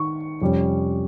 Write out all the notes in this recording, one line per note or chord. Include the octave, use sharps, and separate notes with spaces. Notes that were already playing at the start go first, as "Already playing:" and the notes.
Already playing: D#3 C#6
F2 C3 G3 C#4